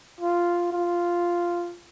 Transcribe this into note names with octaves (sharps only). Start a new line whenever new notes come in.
F4
F4